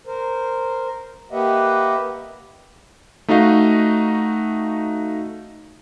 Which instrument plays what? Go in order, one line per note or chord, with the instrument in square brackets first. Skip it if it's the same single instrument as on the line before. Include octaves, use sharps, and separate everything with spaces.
[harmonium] A#4 C5
A#3 G4 B4 D#5 E5 F#5
[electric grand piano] A3 D#4 F#4 D#5 F5